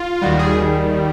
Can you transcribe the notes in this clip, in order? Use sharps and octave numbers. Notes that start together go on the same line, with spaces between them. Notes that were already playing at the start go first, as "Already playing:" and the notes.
Already playing: F4
D#2 D#3 G3 F#4
G#4